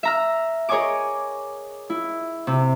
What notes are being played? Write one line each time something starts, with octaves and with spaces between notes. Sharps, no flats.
E5 A#5 F6
G#4 A#4 C#5 D#5 G#5 D6
E4
C3